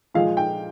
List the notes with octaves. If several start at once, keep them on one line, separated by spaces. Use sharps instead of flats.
A#2 F3 G#3 F5
G5